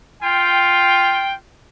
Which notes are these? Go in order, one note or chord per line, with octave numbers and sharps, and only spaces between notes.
F4 G5